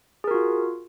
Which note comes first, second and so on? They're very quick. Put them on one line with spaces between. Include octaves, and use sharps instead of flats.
G#4 A#4 F#4 F4